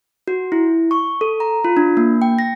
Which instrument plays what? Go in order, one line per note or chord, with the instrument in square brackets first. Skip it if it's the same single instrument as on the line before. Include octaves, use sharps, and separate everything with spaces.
[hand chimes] F#4
E4
C#6
A4
A#5
F4
D4
A#3
G5
A#6